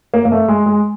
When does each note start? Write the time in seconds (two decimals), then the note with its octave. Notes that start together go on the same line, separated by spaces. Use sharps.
0.14 A#3
0.25 A#3
0.32 A3
0.48 G#3
0.66 G#3